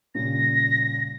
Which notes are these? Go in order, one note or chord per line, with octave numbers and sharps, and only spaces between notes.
A#2 C#3 G3 A#6